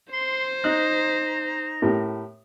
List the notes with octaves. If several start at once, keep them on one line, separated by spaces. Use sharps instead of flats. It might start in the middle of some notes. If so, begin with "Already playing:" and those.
C5 C6
D#4 A#5 F#6
A2 G4 A#4